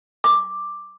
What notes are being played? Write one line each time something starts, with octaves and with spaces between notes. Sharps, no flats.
D6